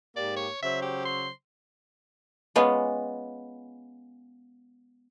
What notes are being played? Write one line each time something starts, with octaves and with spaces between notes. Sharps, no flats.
G#2 A#3 G4 D5
C#5
C#3 F#3 C5 E5
G4
C6
G#3 B3 C#4 F4